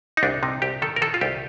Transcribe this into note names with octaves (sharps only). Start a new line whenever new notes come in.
D#4
C2 D4
C3 D#4
C2 G4
D#3 A4
A#4
D#3 A4
F4
C2 G4